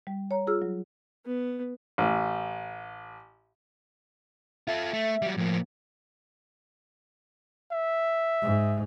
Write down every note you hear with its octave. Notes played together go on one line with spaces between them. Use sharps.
G3
C#5 A#5
F4 G#4 E6 F6
F#3
B3
A1
F4 A4 E5
A3
F#3 G3
A2 F3 A#3
E5
G#2